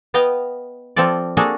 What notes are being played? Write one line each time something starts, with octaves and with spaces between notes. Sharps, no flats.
B3 D#5 F5 G5
F3 C4 F4 A4 D5
A#3 D4 F#4 G#4 A4